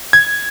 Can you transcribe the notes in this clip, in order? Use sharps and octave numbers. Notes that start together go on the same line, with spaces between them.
G#6